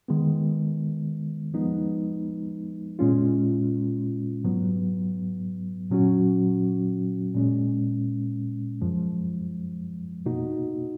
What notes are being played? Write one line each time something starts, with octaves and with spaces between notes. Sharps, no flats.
D#3 G#3 B3
F3 G#3 B3 D#4
A#2 G#3 C#4 F4
G#2 F#3 B3
A#2 F#3 C#4 F#4
A#2 G#3 C#4
F#2 F3 G#3
B2 A#3 D#4 F#4